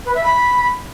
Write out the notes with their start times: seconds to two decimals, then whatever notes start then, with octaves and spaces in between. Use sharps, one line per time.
0.05 B4
0.14 E5
0.23 B5